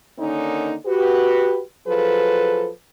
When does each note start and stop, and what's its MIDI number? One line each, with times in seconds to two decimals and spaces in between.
0.19 0.74 50
0.19 0.74 51
0.19 0.74 58
0.19 0.74 61
0.19 0.74 63
0.86 1.61 66
0.86 1.61 67
0.86 1.61 71
1.87 2.69 53
1.87 2.69 54
1.87 2.69 68
1.87 2.69 69
1.87 2.69 71